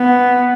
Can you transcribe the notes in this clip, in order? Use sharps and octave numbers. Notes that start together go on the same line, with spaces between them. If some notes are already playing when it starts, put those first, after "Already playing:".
Already playing: B3